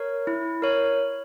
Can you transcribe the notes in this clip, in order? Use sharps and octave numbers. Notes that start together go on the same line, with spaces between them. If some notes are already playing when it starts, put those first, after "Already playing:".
Already playing: A#4 C#5
E4
A#4 C#5